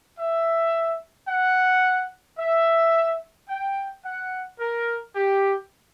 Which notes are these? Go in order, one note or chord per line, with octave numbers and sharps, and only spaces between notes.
E5
F#5
E5
G5
F#5
A#4
G4